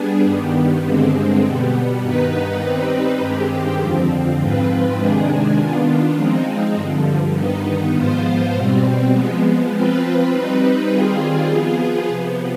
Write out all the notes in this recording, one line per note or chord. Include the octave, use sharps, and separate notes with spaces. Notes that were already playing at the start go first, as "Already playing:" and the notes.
Already playing: G3 B3 D4 G#4
G2 D#3 G3 B3
G2 D3 G#3 C4
B2 G3 B3
G2 D#3 B3 D#4 B4
G3 C4 D#4 B4
G2 D#3 G#3 C4 G4
F2 D3 F3 C4
G#2 F3 C4 F4 B4
C3 D#3 G#3 D4 G#4
D#3 B3 D4 F4
F3 G#3 C4 D#4
G2 D3 F3
G2 D#3 B3 D#4
G#2 F3 B3 F4 C5
B2 G3 C4
F3 G#3 B3
F3 C4 F4 B4
G3 C4 D#4 B4
D#3 G3 C4 F4 G#4
F3 B3 F4 G#4
C3 F3 B3